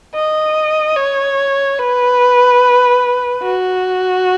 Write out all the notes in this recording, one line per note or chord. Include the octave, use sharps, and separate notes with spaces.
D#5
C#5
B4
F#4